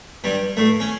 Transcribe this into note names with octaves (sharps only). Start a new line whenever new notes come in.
G2 G3
A2 A3
C#4